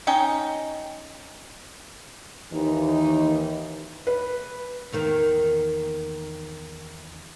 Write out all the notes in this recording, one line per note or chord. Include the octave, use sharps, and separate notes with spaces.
C#4 D#4 G5
D#2 E3 D#4
B4
E2 D#3 A#3